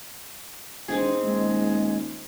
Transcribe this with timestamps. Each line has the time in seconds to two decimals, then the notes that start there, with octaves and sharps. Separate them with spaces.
0.88 E1 C4 D#4 G#4
1.23 D#1 G#3